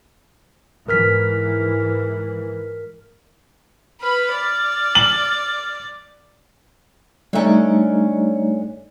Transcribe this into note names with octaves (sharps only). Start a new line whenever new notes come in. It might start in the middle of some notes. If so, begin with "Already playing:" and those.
G#2 E3 A#4 F6 B6
B4 B5 F6
D5
F#7
D3 G3 A3 C#4 D#4